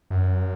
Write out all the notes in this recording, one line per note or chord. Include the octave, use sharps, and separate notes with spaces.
F#2